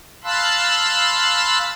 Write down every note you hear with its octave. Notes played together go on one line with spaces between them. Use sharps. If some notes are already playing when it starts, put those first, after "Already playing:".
F5 A5 B5 C6 E6 F#6